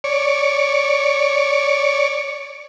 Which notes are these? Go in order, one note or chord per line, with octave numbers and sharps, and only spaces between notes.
C#5 D5